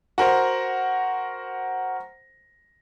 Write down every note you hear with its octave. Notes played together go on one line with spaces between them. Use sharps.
F#4 A#4 C5